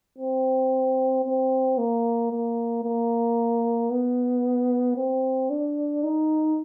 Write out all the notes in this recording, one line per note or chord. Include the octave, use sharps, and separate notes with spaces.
C4
C4
A#3
A#3
A#3
B3
C4
D4
D#4